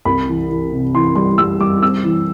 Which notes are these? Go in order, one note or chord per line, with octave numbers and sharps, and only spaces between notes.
C2 B5
E3
E3
C3
E3 C6
G3 C6
G3 E6
G3 D6
C4 E6
E3